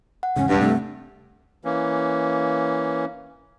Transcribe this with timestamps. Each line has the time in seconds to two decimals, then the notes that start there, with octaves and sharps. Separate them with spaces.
0.23 F#5
0.36 E2 G#2 C#3 C#4
0.49 E1 C#2 G2 D4
0.61 C3 A3
1.64 E3 A#3 C#4